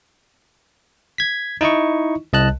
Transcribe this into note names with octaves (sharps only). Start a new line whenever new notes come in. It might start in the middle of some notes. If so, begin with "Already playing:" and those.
G#6 B6
D#4 E4 D#5 C#6
C2 D#5 A5 F#6